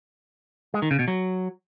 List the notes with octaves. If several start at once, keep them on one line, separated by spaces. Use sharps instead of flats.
G#3
D#3
C#3
B2
F#3